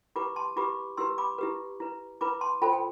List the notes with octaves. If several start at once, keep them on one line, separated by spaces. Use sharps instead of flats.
E4 G4 B4 B5 D6
A5 C6
E4 G4 B4 B5 D6
E4 G4 B4 C6 E6
B5 D6
E4 G4 B4
E4 B4
E4 B4 B5 D6
A5 C6
F4 A4 C5 G5 B5
G5